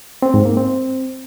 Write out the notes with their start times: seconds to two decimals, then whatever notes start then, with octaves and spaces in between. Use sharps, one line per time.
0.22 C4
0.34 G#2
0.45 A#3
0.57 C4